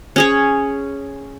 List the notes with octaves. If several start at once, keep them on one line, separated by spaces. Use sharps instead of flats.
C#4 G#4 C#5